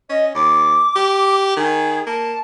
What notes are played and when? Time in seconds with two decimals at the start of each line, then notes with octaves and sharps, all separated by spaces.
0.10 C#4 D#5
0.35 D#2 D6
0.96 G4
1.56 D#3 G#4
2.06 A#3 A5